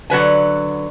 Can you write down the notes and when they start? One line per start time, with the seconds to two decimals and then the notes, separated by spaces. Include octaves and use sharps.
0.10 D3 F#3 B4 G#5